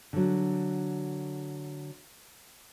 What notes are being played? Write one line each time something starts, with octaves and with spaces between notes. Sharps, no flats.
D3 F#3